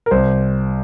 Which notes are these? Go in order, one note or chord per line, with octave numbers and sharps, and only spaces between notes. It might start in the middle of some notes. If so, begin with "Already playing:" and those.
A#4
C2 C5